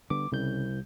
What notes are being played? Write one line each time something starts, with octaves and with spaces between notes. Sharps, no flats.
D3 G3 B3 D6
C2 C#3 G6